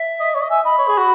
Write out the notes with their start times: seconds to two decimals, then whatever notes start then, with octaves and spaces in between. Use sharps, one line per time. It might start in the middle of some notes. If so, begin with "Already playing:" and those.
Already playing: E5
0.20 D#5
0.34 C#5
0.42 D#5
0.50 E5 G#5
0.64 D#5 B5
0.78 C#5
0.88 G#4
0.98 F#4